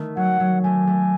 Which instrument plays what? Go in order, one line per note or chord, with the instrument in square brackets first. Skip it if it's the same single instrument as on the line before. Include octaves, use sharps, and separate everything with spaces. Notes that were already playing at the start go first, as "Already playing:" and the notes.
Already playing: [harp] D#3 A3
[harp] F#3 [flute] F#5
[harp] F#3
[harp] A3 [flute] G#5
[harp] A3